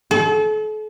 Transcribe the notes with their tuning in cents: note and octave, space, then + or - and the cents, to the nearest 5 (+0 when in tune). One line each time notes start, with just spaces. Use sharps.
A4 -40